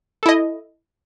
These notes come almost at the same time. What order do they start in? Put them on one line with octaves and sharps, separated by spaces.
A4 E4 D#5